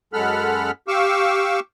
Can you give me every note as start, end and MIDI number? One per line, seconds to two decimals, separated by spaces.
0.13 0.71 42
0.13 0.71 56
0.13 0.71 69
0.13 0.71 78
0.13 0.71 83
0.13 0.71 89
0.88 1.60 67
0.88 1.60 77
0.88 1.60 85
0.88 1.60 86
0.88 1.60 88